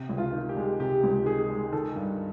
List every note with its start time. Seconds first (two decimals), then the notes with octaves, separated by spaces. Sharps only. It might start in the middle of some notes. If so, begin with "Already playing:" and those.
Already playing: C3
0.09 C#2
0.18 F4
0.33 D#3
0.49 G4
0.57 G#3
0.80 C3 G4
1.04 C#2
1.26 D#3 G#4
1.50 G#3
1.72 D#3 A4
1.96 G2